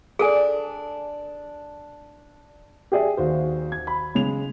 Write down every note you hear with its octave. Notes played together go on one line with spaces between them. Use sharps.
D4 G#4 A4 G#5
G4 G#4 D5 E5
D#2 F#4 C5
G#6
B5
C#3 G#3 F7